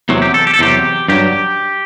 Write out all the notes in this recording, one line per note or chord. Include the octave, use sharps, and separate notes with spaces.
E2 C3 F#3
G4
A4
G4
A4
E2 C3 F#3 G4
G2 F#3 G4